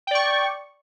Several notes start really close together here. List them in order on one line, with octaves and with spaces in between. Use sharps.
G5 D5 C#6